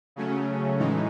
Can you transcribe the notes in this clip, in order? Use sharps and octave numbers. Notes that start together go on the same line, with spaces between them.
C#3 F#3 A3 C#4
A2 E3 G#3 D#4